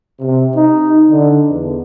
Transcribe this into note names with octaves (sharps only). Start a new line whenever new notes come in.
C3
D#4
D3
E2